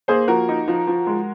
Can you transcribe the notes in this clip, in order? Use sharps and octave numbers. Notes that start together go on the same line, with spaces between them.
A#3 G#4 C5
F3 F#4 A#4
D#4
F3
F3
G#3